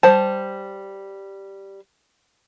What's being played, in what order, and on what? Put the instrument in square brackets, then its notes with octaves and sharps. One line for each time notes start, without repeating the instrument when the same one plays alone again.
[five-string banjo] G3 C5 A5